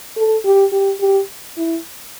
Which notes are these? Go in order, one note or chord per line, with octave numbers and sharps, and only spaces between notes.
A4
G4
G4
G4
E4